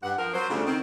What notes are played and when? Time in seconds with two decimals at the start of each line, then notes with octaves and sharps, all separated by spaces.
0.03 G2 F#5
0.18 F3 A#4
0.34 F#3 C5
0.49 D2 C#3 G3 A3 D4 F4
0.66 D#3 C4